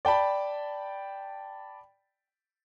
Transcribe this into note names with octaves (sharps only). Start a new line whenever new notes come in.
D5 G5 A5 B5